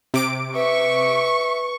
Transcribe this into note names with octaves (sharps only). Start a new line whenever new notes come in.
C3 D6 D7
B4 E5 C#6